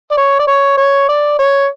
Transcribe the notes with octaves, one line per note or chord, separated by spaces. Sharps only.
D5
C#5
D5
C#5
C#5
D5
C#5